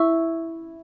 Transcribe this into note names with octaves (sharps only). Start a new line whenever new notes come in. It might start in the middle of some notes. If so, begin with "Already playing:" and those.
Already playing: E4 E5 C#6 E6